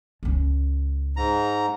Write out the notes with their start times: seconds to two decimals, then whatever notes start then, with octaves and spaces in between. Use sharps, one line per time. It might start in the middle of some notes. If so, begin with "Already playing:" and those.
0.23 C#2 G#3
1.16 G#2 A#5